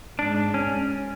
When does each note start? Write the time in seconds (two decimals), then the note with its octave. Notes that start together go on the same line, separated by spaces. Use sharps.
0.19 G#2 D4
0.54 C#4